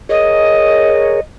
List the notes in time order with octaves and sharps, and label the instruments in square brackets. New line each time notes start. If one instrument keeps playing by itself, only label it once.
[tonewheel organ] G#4 A#4 C#5 [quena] D#5